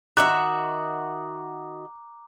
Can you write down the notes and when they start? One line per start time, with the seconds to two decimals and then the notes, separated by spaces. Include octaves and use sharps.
0.17 D#3 F#4 E5 A#5 D6 F#6